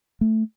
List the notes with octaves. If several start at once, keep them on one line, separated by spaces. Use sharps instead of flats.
A3